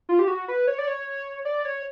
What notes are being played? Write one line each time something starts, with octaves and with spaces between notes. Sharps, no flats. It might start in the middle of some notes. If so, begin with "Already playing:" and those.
F4
G4
F#4
B4
C#5
D5
C#5
D5
C#5